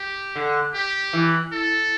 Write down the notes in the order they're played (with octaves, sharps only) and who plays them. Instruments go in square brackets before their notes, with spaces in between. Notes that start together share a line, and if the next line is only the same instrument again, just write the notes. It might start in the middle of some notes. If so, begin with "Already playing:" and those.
Already playing: [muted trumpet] G4
[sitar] D3
[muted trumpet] G4
[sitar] E3
[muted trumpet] A4